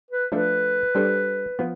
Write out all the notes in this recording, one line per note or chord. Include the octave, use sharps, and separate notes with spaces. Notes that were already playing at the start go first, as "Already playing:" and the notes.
B4
F3 A3 D4 A4 B4
G3 D4 A4 C5
F3 B3